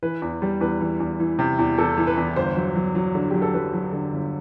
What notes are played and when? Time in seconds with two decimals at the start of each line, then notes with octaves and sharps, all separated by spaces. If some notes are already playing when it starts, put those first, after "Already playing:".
0.03 E3 B4
0.22 E2
0.42 G3
0.61 E2 B4
0.81 E3
1.00 E2
1.20 E3
1.39 C3
1.59 E2
1.78 E2 A4
1.98 E3
2.07 B4
2.17 E2
2.36 G1 C5
2.57 F#3
2.76 F#3
2.95 F#3
3.15 D3
3.30 F#3 G4
3.42 A4
3.54 F#3 B4
3.73 F#3
3.93 D3
4.12 G1